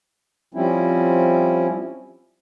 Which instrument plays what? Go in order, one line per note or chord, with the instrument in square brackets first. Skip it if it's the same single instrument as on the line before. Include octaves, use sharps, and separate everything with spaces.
[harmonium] F3 G3 C4 C#4 E4